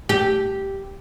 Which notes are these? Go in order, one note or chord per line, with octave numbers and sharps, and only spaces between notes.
G4